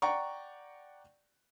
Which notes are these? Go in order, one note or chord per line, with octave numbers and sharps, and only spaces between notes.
D5 F#5 G5 A#5 C#6